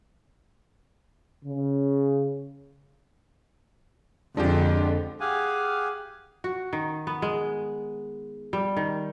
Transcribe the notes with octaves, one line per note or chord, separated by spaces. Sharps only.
C#3
F2 D3 G#3 D4 F4 G4
G4 G#4 F5 F#5 G#5
F#4
D#3
B3
G#3
G3
D#3